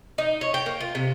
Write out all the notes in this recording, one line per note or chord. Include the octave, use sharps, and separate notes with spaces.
D#4
C#5
G5
A#3
F4
C3